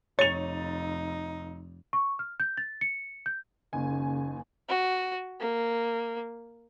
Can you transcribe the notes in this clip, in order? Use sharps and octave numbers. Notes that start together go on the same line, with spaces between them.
F1 F2 D#4 C#5 A6 F7
C#6
F6
G6
A6
C#7
G6
F#1 D#2 C#3 G#5
F#4
A#3